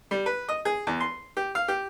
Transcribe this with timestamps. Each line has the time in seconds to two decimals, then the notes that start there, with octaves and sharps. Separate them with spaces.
0.11 G3
0.26 B4
0.49 D#5
0.65 G#4
0.87 E2
1.00 C6
1.37 G4
1.55 F5
1.68 G4